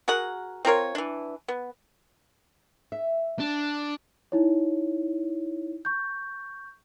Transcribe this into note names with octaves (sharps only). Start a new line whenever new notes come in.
F#4 G#4 A#4 F#5
C4 F4 A#4 C#5
E3 D4
B3
E5
D4
D#4 E4 C#5
C#6 G6